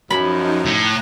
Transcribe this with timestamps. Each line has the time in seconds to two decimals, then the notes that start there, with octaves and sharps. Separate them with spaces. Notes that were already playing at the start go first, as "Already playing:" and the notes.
0.10 F#2 F3 D#4 B5
0.66 A2 A#5 F#6